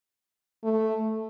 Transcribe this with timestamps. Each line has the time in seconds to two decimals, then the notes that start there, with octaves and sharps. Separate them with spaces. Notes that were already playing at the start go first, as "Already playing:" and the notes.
0.64 A3